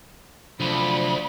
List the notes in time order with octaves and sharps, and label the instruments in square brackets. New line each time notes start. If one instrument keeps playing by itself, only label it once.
[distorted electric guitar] D2 [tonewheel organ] C3 F#3 D4 [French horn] F3 [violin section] B5